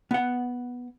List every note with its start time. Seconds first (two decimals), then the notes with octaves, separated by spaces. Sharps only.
0.11 B3 F#5